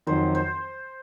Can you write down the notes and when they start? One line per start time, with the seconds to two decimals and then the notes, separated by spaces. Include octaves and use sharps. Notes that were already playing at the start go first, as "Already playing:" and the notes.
0.07 F2 D#3 F#3 C5
0.35 C5